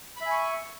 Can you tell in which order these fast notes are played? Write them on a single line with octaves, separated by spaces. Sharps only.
B5 E5 G#5 C#6